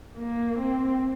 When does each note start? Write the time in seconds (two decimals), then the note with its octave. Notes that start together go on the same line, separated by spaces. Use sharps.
0.17 A#3
0.59 C4